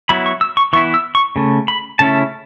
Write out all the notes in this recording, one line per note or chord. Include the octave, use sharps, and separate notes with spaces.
F#3 B3 E4 B5
C#6
E6
C#6
E3 B3 E4 C#6
E6
C#6
C#3 A3
B5
C#3 A3 C#4 E4 A5